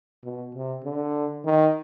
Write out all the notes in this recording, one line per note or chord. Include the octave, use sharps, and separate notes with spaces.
B2
C3
D3
D#3